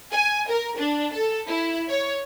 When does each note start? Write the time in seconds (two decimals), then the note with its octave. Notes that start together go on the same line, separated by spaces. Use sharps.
0.11 G#5
0.48 A#4
0.77 D4
1.13 A4
1.48 E4
1.88 C#5